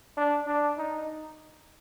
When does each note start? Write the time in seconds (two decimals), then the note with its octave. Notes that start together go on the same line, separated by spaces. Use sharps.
0.17 D4
0.47 D4
0.78 D#4